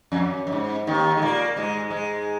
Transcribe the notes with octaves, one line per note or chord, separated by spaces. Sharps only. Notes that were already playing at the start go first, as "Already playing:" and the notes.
F2
F#2
F#2
G#2
D#2 D#3
G#3
A#2 A#3
G#2 G#3
G#2 G#3